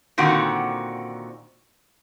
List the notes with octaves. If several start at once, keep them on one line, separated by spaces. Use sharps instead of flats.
A#2 D3 D#3 C4 F#4